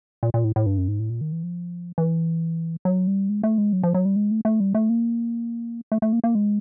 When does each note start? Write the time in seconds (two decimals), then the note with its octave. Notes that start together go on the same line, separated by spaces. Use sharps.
0.23 A#2
0.34 A#2
0.44 A2
0.56 A2
0.66 G2
0.78 F#2
0.88 G#2
0.99 A2
1.10 A#2
1.21 D#3
1.32 E3
1.43 F3
1.98 E3
2.85 F#3
3.07 G3
3.29 G#3
3.43 A3
3.58 G#3
3.73 F#3
3.83 F3
3.94 F#3
4.05 G3
4.16 G#3
4.31 A3
4.45 A3
4.60 G3
4.75 A3
4.89 A#3
5.92 A3
6.02 A3
6.13 A#3
6.24 A#3
6.35 G#3